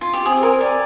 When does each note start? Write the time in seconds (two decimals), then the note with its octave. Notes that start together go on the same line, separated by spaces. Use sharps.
0.01 F4
0.13 G4
0.26 C4 G#4
0.43 A#4 G#5
0.60 G4 D5